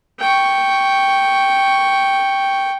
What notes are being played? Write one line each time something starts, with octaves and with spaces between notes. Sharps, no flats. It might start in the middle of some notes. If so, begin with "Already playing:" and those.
G5 C#6